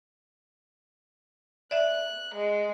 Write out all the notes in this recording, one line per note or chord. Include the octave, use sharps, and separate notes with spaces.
D5 E5 F#6
G#3